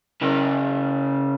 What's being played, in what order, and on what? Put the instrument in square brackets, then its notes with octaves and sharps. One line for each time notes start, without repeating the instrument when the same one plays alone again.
[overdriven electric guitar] C#3 A#4